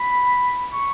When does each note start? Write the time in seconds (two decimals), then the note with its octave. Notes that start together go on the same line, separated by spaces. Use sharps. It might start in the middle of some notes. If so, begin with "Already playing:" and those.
Already playing: B5
0.73 C#6